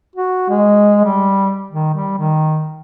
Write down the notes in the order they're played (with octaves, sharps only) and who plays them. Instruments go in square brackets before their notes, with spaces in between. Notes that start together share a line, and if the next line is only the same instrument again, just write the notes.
[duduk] F#4
G#3
G3
D#3
G3
D#3